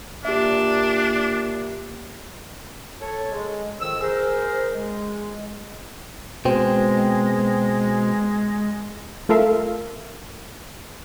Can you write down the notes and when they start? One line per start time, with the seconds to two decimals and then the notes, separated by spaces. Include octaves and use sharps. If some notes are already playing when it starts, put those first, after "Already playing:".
0.25 A#2 D4 G4 E5
3.01 A4 C#5
3.32 G#3
3.80 F2 D#3 E6
4.00 G#4 A#4 C5
4.73 G#3
6.45 B2 G#3 C4
9.29 A3 F4 A4 A#4 E5 F5